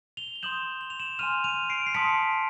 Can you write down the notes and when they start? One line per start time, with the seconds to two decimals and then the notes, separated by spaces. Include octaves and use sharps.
0.17 F7 G7
0.36 G7
0.43 C6 D#6 G6 E7 F#7
0.81 F#7
0.90 F7
0.99 E7 F#7
1.19 G#5 C6 F6 D#7 F7
1.44 D#7 F7
1.70 C7 D7
1.86 C7
1.94 A5 C6 D#6 B6 C#7